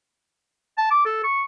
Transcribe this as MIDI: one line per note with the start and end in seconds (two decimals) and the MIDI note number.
0.78 0.90 81
0.91 1.06 86
1.06 1.22 69
1.24 1.44 85